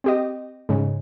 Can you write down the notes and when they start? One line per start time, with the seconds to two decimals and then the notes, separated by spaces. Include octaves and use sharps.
0.04 C4 G4 D#5
0.69 G#2 C#3